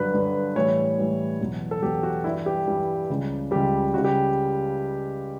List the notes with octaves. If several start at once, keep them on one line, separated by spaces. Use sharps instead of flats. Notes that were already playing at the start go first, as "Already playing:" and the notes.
Already playing: G2 D3 F#3 B4
G2 D3 F#3
A2 E3 G3 C#5
A2 E3 G3
E2 B2 F#3
A4
E2 B2 F#3 G4
F#4
G2 E3 G3 E4
G4
G2 E3 G3
C#2 C#3 G3
C#2 C#3 G3 G4
C#2 C#3 G3 F#4
G4